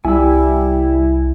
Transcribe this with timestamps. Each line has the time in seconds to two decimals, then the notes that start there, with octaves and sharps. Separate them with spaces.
0.05 C2 G3 E4 G#5 E6